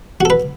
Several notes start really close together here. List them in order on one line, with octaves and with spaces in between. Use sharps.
F#4 A4 B4